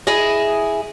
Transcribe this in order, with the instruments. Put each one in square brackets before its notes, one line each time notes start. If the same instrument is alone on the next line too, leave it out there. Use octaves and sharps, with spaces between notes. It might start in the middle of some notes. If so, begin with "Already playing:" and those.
[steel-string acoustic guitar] E4 G#4 D#5